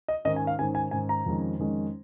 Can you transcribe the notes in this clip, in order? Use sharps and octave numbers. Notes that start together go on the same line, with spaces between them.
D#5
G#2 D#3 C#4 D#5
G#5
F5
G#2 D#3 C#4 G#5
G#5
G#2 D#3 C#4 G#5
A#5
F2 D#3 G#3 C#4
F2 D#3 G#3 C#4